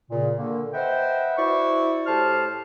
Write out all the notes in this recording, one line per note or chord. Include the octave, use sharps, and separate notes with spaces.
A#2 C#3
D3 D#3 A#3
B4 C5 D#5 E5 F#5 G5
E4 F#4 C5 D5 C#6
A2 G4 C5 A5 C6 F6